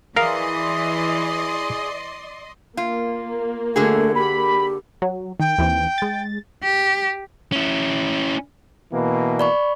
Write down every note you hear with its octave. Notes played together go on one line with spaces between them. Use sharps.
E3 G#4 A#4 D5 D#5 F5 C6
A#3 F4
D3 A3 F#4 G#4
G4 B5
F#3
D#3 G5
D#2 E3 C4
G#3 A6
G4
C#4 E4
B2 E3 A#3
D5 B5 C#6